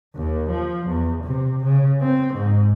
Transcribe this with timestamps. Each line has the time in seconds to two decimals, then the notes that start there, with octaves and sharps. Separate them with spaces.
0.16 D#2
0.50 F3
0.87 E2
1.24 C3
1.63 C#3
2.02 C4
2.34 G#2